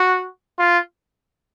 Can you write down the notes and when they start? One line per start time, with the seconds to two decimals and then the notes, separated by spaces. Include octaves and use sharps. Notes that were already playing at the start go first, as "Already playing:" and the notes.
Already playing: F#4
0.59 F4